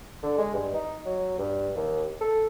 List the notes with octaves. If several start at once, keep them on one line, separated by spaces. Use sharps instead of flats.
D3
G#3
G2
D#4
F#3
G2
D#2
A4